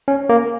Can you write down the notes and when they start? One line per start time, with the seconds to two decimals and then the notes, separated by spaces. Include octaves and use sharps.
0.08 C#4
0.29 A#3